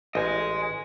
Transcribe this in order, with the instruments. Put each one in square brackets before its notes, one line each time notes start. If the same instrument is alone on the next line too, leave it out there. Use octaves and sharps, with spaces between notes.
[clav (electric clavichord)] A1 [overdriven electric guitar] D#5 G#5